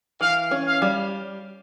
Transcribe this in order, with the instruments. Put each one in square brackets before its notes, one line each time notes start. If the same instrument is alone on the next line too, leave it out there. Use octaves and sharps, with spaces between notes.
[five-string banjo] E3 [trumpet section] F5
[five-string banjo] C#4
[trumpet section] F5
[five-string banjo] G3